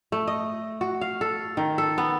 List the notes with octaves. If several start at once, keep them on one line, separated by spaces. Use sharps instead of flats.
A3
D#5
F#4
F5
A4
D#3
A4
B3